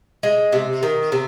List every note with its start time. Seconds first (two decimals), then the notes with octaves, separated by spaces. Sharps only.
0.23 G#3
0.53 C3
0.83 D#3
1.12 C3